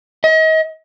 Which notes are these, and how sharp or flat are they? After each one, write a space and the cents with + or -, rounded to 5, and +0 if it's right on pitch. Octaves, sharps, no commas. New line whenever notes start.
D#5 +35